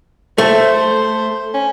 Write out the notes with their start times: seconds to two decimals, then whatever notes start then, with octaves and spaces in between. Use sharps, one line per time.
0.38 A3 C5
1.54 C#4